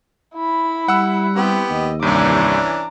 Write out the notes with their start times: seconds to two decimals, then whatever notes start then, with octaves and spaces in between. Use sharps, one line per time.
0.35 E4 B5
0.88 G3 F#5 E6
1.36 B3 C4 E4 G4
1.70 D#2 D#5
2.02 C2 G2 E3 C#4 D4 A#5 D6